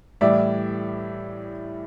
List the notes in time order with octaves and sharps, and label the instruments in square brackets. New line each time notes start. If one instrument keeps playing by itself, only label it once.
[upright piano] A2 E3 G3 D5 E5